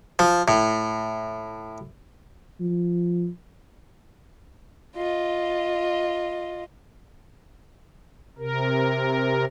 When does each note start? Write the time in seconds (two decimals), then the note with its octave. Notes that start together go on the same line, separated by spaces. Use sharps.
0.19 F3
0.48 A2
2.60 F3
4.96 F4 D#5
8.38 C3 A#4